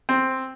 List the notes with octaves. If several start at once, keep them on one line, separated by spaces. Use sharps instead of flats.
C4